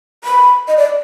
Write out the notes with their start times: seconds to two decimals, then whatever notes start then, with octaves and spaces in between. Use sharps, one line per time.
0.24 B5
0.68 D#5
0.77 D5